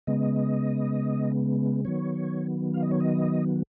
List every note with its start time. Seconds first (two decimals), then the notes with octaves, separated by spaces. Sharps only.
0.07 C#3 G#3 B3 D#5
1.85 D#3 F#3 B3 C#5
2.74 F5
2.83 D#5
2.91 C#5
3.00 D#5